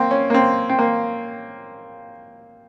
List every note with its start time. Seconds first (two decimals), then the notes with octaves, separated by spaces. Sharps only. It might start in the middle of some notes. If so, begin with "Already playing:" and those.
Already playing: A#3 C4
0.11 C#4
0.30 A#3
0.34 C4
0.69 C4
0.79 A#3